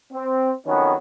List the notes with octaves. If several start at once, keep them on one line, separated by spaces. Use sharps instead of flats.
C4
F2 D#3 F#3 B3 C#4